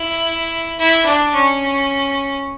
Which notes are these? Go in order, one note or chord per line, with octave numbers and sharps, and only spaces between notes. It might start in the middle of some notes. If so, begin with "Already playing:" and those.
Already playing: E4
E4
D4
C#4